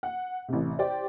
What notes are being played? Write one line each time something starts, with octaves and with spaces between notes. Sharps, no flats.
F#5
A1 C3
G4 C5 D5 G5